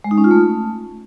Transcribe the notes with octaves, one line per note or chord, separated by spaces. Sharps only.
G#3
D#4
C#4
F4
A3